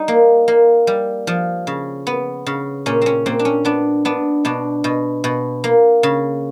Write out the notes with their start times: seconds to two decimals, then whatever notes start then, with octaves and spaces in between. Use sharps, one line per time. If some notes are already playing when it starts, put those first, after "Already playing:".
Already playing: G3 D#4
0.08 A#3
0.48 A#3
0.87 G3
1.27 F3
1.67 C#3
2.07 B3
2.46 C#3
2.86 A#2 C#4
3.02 C4 C#4
3.26 A#2 C4
3.39 D4
3.45 C#4
3.65 B3 D4
4.05 B3 D4
4.45 B2 D4
4.84 B2
5.24 B2
5.64 A#3
6.03 C#3